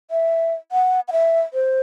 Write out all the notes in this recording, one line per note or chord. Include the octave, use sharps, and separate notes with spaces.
E5
F#5
F#5
E5
C5